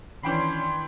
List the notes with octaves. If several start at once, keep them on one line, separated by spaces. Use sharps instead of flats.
D#3 E3 C#4 D4 G5 B5 C6